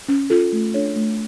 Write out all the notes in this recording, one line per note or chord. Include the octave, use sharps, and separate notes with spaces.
C#4
F4 A4
A3
D4 A4 C#5
A3